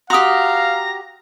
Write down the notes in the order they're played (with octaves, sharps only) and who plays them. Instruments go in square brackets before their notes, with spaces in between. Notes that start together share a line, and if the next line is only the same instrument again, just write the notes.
[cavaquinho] F#4 G4 [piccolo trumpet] F5 [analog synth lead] A#5 [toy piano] C6 D#6